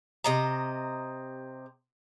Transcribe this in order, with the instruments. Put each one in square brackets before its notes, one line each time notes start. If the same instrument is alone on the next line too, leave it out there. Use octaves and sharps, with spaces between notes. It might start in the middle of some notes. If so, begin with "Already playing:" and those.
[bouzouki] C3 D#5 A#5